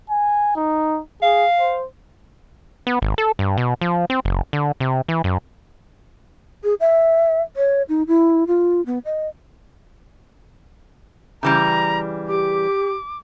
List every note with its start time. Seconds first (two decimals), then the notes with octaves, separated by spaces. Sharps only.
0.10 G#5
0.56 D#4
1.22 G#4 F5
1.59 C5
2.87 B3
3.02 G#1
3.18 A4
3.39 G2
3.58 B2
3.81 F3
4.10 C4
4.25 F#1
4.53 D3
4.80 C3
5.08 E3
5.24 F#2
6.64 G#4
6.80 E5
7.56 C#5
7.89 D#4
8.07 E4
8.47 F4
8.86 B3
9.05 D#5
11.43 C#3 E3 G3 A#5
12.28 G4 D6